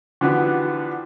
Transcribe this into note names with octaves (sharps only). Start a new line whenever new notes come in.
D3 E3 F3 B3 F#4 G4